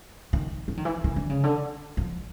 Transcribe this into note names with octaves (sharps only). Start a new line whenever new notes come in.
D#3
E3
D#3
E3
D#3
D3
C#3
D3
F3